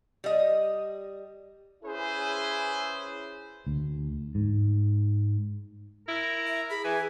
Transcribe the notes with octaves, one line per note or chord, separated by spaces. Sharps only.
G3 D#5
C#4 E4 G#4 B4 C5
D2
G#2
E4 A#4
E5
G#4 B5
E3 G#5